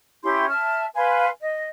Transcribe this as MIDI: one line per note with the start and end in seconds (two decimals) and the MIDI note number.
0.23 0.48 61
0.23 0.48 64
0.23 0.48 67
0.23 0.48 84
0.48 0.86 76
0.48 0.86 81
0.48 0.86 89
0.94 1.27 71
0.94 1.27 77
0.94 1.27 80
0.94 1.27 84
1.39 1.67 75